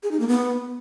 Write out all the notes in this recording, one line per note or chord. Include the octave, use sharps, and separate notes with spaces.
G#4
D#4
A#3
B3